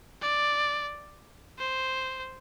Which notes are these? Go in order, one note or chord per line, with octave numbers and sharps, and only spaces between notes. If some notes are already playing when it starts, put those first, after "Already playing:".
D5
C5